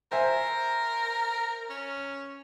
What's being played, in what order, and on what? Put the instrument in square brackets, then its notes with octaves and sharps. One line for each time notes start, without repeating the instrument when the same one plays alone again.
[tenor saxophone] A#4 [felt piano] C5 E5 G#5
[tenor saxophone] C#4